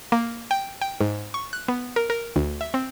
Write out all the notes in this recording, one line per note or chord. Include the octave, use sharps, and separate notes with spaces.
A#3
G5
G5
G#2
C#6
F#6
B3
A#4
A#4
D2
E5
C4